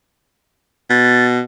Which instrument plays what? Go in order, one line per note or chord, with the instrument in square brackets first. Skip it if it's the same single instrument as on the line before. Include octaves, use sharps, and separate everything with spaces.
[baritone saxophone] B2 [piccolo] A6